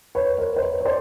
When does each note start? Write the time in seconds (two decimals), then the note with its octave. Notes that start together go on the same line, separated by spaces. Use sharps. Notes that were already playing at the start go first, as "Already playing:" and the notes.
0.15 B4 C#5
0.38 A#4 C5
0.56 C5
0.62 B4 C#5
0.81 C#5
0.85 C5 D5